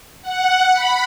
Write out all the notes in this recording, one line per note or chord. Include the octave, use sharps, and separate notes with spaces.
F#5
B5